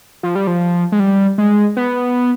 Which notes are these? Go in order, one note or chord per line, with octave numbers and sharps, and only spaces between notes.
F3
G3
F3
G#3
G3
G#3
B3